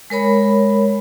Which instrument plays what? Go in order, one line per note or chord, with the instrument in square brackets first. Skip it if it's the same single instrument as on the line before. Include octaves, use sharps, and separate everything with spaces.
[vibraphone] G#3 A#4 C#5 B5